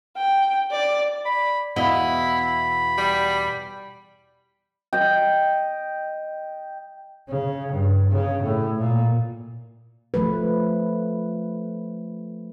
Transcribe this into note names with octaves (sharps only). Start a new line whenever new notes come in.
G5
D5
D5 B5
E2 B2 E4 D#5 F5 F#5 B5
G3
D#5 G5
C#3
G2
C#3
A2
A#2
F3 A3 B4